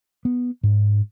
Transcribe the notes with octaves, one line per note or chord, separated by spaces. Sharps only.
B3
G#2